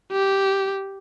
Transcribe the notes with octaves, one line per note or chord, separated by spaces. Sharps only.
G4